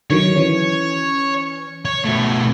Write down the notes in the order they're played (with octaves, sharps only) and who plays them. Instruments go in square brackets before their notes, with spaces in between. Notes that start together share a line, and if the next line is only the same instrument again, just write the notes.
[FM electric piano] D3 D#3 F#3 [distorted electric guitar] C#5
[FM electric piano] E3 C#4
[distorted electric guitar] C#5
B2 A3